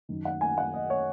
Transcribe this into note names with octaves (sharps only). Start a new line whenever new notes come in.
F#2 D#3
F#5
G#5
F#5
D#5
C#5